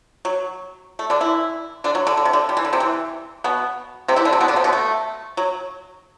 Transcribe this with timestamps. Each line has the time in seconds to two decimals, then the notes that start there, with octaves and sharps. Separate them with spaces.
0.25 F#3
0.99 A3
1.10 D3 D4
1.20 E3 E4
1.84 D3 D4
1.95 F#3
2.07 D3
2.17 D3
2.25 C3
2.33 D3
2.49 G3
2.57 E3
2.65 D3
2.73 C3 C4
2.80 E3
3.44 B2 B3
4.08 C3 C4
4.16 E3 E4
4.25 D3 D4
4.33 C3 C4
4.41 B2 B3
4.48 D3 D4
4.56 C3 C4
4.64 B2 B3
4.73 A3
5.37 F#3